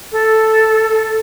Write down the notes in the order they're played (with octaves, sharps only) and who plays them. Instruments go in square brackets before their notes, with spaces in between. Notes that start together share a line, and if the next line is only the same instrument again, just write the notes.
[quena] A4